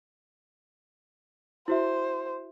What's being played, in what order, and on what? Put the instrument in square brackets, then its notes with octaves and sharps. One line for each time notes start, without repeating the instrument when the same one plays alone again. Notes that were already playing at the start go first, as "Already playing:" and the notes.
[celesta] E4 F#4 E5 [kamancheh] C5